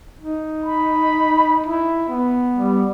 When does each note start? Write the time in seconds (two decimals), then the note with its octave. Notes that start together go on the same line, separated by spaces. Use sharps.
0.21 D#4
0.64 B5
1.66 E4
2.09 B3
2.57 G3